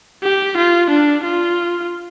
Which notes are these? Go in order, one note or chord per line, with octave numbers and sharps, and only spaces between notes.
G4
F4
D4
F4